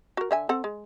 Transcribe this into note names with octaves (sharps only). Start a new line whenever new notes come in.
F#4 A#4
D3 E5 G#5
C4 A4 F#5
G#3